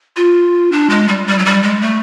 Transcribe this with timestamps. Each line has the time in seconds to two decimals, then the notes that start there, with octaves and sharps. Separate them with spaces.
0.16 F4
0.72 D4
0.90 G#3
1.08 G3
1.27 G3
1.39 F#3
1.46 G3
1.63 G#3
1.81 A3